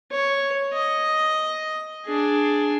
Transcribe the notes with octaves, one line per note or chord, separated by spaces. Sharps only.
C#5
D#5
D4 G#4